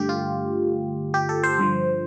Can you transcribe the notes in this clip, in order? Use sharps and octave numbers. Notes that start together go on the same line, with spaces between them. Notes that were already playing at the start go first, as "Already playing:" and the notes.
Already playing: G2 D3 A3 G4
F4
G4
A4
C5
G2 D3 F3